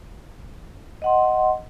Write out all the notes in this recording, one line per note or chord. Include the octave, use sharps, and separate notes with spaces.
D#5 F#5 C6